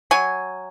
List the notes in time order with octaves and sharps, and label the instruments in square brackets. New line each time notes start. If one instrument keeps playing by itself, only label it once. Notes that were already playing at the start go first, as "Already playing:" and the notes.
[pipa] F#3 G#5